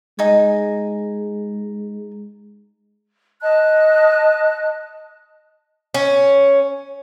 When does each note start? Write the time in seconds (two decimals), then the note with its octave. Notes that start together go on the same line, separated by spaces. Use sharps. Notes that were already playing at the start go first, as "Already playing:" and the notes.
0.19 G#3 D#4 G#5
3.42 D#5 A5 F#6
5.94 C#4